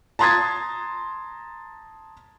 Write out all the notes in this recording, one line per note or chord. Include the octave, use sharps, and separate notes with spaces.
A5 A#5 C6 D#6 G#6 A6